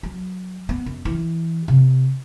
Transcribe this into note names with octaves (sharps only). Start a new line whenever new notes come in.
F#3
B3
F#2
E3
C3